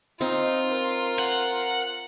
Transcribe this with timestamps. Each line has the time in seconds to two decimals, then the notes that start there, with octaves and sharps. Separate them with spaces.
0.21 C4 D#4 F4
0.72 A#4
1.19 F#5